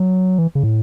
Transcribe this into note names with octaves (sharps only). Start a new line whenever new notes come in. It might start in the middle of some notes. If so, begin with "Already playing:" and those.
Already playing: F#3
E3
C#3
A2